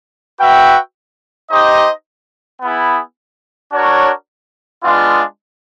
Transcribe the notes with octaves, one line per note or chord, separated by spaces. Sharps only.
F#4 B4 E5 G5
D#4 G4 C5 D#5
B3 E4 G#4
D4 F#4 A#4 C#5
G#3 B3 D4 F4